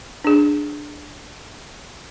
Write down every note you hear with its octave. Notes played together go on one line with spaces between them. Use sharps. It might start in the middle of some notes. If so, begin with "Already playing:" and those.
D4 G#4